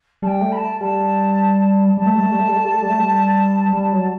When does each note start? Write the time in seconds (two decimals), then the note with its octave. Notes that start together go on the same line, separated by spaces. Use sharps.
0.22 G3 G5 A5
0.41 A3
0.52 B5
0.56 A5
0.80 G3 A5
1.97 G3 A5
2.06 A3
2.14 G3
2.23 A3
2.31 G3
2.40 A3
2.48 G3
2.57 A3
2.65 G3
2.74 A3
2.82 G3
2.90 A3
2.99 G3
3.73 G3
3.93 F#3